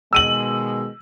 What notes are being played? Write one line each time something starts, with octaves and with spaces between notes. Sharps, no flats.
B2 D#3 G#3 E6 D#7 F#7